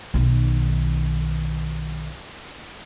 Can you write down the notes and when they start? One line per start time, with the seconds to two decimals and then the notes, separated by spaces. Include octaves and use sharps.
0.14 B1 D#3